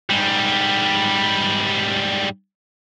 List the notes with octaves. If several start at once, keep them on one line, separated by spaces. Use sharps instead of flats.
G#2 G3